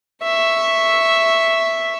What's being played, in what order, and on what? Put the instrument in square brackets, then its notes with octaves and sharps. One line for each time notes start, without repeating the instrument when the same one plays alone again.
[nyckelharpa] E5 C#6